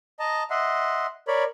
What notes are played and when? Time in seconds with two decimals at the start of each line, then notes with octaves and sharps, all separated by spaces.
0.20 D#5 A5 A#5
0.50 D#5 E5 F#5 C6
1.28 A#4 C#5 D5 B5